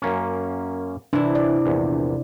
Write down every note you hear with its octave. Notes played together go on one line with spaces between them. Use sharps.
F#2 A#3 C#4
C3 E3 D4 E4
D5
A#1 E2